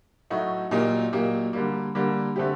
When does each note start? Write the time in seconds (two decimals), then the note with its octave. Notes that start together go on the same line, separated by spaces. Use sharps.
0.30 A2 F#3 A3 D#4 F#4
0.71 A#2 F#3 A#3 D#4 G4
1.13 A#2 F#3 A#3 D#4 G4
1.53 D3 G3 A#3
1.95 D3 G3 A#3
2.36 D3 A3 C4 G4